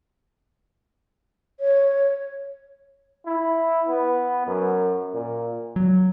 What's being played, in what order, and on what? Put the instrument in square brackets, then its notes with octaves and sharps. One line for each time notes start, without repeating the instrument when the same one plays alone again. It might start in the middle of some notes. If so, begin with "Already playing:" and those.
[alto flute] C#5
[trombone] E4
B3
F#2
A#2
[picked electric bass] F#3